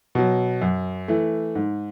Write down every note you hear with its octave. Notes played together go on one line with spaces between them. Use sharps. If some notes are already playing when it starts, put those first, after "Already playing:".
B2 F#3
F#2
E3 A3
G#2